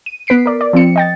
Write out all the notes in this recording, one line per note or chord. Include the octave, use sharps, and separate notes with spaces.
D#7
B3 B4 B6 C7 D7
A#4 D5
D5
F3 C4 C#7
D#5 G5 A6